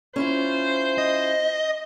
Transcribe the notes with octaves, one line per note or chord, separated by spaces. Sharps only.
C#4 E4 F4 C5
D#5